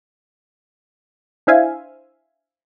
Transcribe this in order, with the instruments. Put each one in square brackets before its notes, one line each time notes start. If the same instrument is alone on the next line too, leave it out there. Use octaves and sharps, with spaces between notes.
[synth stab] D4 E4 C5 E5 F5 G#5